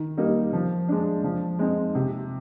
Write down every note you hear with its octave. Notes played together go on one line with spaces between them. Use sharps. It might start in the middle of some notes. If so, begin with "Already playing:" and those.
Already playing: D#3
G3 A#3 D#4
F3
G#3 D4
F3
G#3 C4 D#4
C3